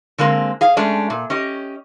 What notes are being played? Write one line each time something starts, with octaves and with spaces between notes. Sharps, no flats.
D3 G#3 A#3 C4
G#4 F5
G#3 A3 C#4 D4
A#2
C#4 G4 D#5